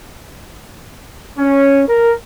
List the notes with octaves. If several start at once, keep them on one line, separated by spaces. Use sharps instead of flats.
C#4
A#4